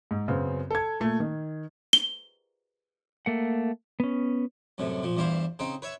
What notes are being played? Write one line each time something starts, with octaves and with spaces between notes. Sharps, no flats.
G#2
F#2 C#3 F#3 B3 C4
A4 G#6
A#2 A3
D#3
G7
A3 A#3 F#5
B3 C#4
C2 F#2 A2 C3
A#2 F3
E2 G2 E3 E4 C5 F5
C#3 C4 D#4
B4 C#5 E5